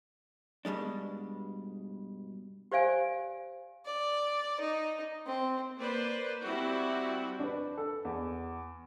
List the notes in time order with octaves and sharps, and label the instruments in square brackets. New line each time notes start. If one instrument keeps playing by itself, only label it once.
[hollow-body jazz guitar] G2 B2 G3 G#3 D4
[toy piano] G4 C5 D5 F5 G#5
[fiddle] D5
D#4
C4
[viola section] A#3 B4 C5 D5
G3 C4 E4 F#4
[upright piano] D4 B4
A4
E2